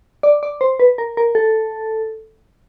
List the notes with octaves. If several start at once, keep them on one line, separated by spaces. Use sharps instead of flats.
D5
D5
C5
B4
A#4
A#4
A4